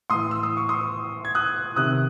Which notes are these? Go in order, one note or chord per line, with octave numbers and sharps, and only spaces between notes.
A2 E3 C6 D#6
E6
D#6
C#6
C6 D#6
G#6
D#6 F#6
C3 D#3 D#6 F#6